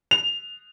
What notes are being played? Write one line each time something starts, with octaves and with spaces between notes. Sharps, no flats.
F7